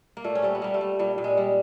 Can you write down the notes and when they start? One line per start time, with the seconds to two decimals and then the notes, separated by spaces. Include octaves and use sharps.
0.17 A#3
0.24 A#2 A3
0.35 C#4
0.42 G3 C4
0.55 B3
0.62 G3 A#3
0.74 A3
0.81 G3
0.99 A#2 G3
1.18 A#2
1.24 G#3
1.37 G3